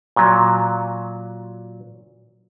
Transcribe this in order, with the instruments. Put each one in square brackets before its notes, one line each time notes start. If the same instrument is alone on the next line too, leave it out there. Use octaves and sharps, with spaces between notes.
[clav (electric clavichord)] A#2 F#3